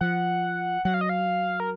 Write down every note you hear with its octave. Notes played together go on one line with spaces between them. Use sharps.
F3 F#5
F#3 F#5
F5
D#5
F5
A#4